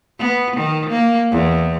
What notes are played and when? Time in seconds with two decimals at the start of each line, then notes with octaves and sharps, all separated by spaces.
0.20 B3
0.56 D#3
0.90 A#3
1.32 E2